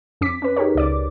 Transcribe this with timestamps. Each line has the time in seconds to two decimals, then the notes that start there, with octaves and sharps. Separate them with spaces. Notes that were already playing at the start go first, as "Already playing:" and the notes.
0.21 F2 C#4 D6 B6
0.42 C#4 B4
0.56 D#4 G4 G#4 A#4 C#5
0.75 C#2 D5 D6